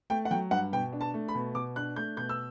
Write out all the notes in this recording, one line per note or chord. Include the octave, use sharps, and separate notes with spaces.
A3 G5
F#5
F#3 G5
G2 F#5
B2 G5
D4
A5
A3
B5
B2
B2 D6
D4 F#6
A3 G6
B2 G6
E6